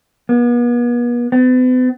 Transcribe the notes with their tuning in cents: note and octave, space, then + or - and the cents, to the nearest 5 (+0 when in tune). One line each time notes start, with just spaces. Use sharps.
B3 -40
B3 +45